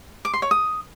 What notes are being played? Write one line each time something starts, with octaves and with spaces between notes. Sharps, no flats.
D6
C6
C#5
D#6